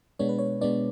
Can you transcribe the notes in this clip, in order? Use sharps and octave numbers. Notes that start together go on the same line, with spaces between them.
B2 G#3 B3 D4 C#5
B4
C#5
B2 G#3 B3 D4 D5